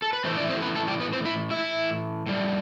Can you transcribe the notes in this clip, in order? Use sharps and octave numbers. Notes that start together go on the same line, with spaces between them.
A4
B4
A2 E3 A3 C4 C5
D4 D5
C4 C5
B3 B4
A3 A4
G3 G4
B3 B4
C4 C5
E4 E5
E4 E5
A2 G3